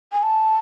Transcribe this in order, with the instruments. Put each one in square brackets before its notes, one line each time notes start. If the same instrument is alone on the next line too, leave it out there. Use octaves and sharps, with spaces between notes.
[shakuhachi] G#5
A5